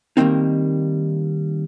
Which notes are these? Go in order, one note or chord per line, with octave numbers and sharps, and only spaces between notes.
D#3 G3 A3 A#3 C4 D#4